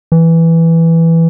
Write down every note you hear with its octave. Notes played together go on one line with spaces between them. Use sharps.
E3